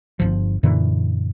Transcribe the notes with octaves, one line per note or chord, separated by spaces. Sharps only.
G1 C2 F3
F#2 A#2 D3 E3